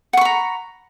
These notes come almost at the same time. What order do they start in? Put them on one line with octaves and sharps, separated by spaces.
F#5 C#6 B5 A#5